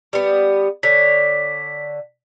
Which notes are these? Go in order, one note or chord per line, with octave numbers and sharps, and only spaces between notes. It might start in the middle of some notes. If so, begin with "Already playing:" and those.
G3 B3
D3 C#5 B6